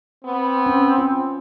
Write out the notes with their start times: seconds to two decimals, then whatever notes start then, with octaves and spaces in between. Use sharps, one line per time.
0.25 B3 C4
0.66 C#4
0.98 F4